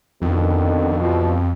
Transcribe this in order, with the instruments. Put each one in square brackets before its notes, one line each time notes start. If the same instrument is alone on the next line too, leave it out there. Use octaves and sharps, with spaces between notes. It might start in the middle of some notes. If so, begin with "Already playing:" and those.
[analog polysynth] F2 [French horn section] B2 D3 D#3
[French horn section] E2 B2 F3